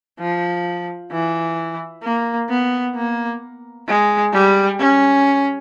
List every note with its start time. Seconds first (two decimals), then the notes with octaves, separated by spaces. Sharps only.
0.20 F3
1.12 E3
2.03 A#3
2.49 B3
2.95 A#3
3.87 G#3
4.33 G3
4.79 C#4